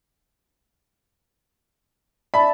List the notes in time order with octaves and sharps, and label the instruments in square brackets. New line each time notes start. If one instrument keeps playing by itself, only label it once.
[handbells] D5 E5 A5 [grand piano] B5